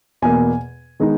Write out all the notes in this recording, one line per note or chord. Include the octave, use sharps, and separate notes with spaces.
E2 B2 A#3 G#5
D#3 G#3 B3 D#4